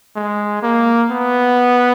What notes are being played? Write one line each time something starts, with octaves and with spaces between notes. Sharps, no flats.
G#3
A#3
B3